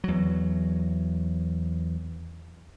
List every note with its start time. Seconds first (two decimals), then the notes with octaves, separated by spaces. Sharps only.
0.04 E2 F#3